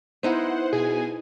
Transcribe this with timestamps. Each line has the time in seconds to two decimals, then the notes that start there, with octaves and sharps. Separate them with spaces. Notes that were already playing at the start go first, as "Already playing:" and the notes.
0.23 B3 D#4 E4 C5 F#5
0.73 B2 G#4 G#5